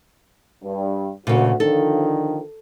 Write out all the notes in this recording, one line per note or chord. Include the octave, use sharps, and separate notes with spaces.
G2
D2 A#2 C#3 F#4
D3 D#3 F3 A4